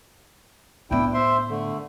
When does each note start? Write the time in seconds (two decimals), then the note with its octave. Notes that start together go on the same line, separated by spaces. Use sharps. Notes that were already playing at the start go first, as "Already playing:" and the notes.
0.91 A2 B3 D4 E4 G5
1.14 C5 E5 C6
1.50 D3 A3